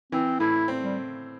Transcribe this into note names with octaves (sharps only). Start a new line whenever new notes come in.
E3 C4
A2 E4
C4
G3